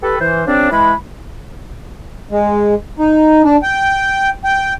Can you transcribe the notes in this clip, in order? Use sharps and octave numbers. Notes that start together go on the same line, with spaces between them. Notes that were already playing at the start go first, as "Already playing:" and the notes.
G4 A4 B4
E3 C5
C#3 F3 C4 D4
E3 G#3 B5
G#3
D#4
D4
G5
G5